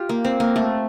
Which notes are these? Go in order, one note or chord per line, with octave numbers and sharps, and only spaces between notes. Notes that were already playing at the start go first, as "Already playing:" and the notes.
Already playing: F4 G4
A#3
C4
A#3
A3